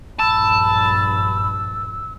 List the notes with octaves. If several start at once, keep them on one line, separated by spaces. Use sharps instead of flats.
A#1 G2 A5 B5 E6